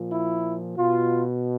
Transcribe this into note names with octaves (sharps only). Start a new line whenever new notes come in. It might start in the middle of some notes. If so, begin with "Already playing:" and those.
Already playing: A#2 F3
E4
B2 F4